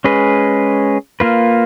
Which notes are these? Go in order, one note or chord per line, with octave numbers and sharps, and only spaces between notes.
G#3 C#4 G#4 B4
A#3 F4 B4